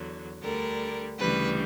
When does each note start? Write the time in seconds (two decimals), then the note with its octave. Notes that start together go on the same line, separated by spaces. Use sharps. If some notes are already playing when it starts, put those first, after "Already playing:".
Already playing: E2 D3 F#3
0.42 D2 D3 G3 A#4
1.18 D2 C#3 E3 G3 B4